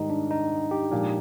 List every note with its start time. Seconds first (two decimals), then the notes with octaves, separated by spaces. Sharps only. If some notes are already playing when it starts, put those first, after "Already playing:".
Already playing: G#2 D#3 G3 D#4
0.10 D4
0.31 D#4
0.71 G4
0.91 A#2 F3 G#3